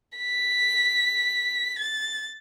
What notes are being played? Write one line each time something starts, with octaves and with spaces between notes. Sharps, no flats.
B6
A6